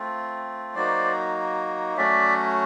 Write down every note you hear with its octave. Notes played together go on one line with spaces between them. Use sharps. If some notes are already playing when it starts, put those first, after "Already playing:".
Already playing: A3 C4 F4
F#3 A#3 D#4 F#4 C5 D5
F#3 A3 C#4 F#4 D5 E5